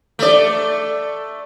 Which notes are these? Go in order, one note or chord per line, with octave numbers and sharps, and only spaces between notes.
A3 D5